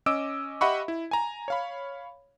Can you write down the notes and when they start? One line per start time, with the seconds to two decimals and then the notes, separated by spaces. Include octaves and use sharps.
0.06 C#4 D#5 D6 E6 D7
0.61 G4 D#5 E5 F#5 B5 C#6
0.88 E4
1.11 G#5 A#5
1.48 C#5 F5 B5